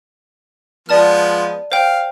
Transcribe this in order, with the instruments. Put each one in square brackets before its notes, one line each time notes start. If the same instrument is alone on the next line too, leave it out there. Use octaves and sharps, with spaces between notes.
[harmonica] F3 G#3 B3 [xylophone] D5 A5 F6
[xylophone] C5 G5 [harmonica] F5